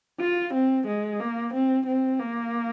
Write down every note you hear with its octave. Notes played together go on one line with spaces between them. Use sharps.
F4
C4
G#3
A#3
C4
C4
A#3